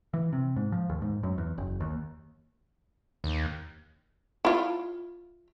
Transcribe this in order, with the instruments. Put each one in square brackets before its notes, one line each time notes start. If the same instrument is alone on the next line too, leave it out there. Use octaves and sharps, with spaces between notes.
[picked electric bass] E3
C3
G#2
F3
D#2
G#2
F#2
E2
F#1
D#2
[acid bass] D#2
[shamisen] E4 F4